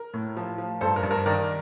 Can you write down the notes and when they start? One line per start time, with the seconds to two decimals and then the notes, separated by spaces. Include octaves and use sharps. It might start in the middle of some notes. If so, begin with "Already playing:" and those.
Already playing: A#4
0.14 A2
0.37 F3
0.58 F3
0.81 G2 A4 C5
0.96 A#4
1.03 G2
1.11 A#4
1.26 D#3 A#4 D5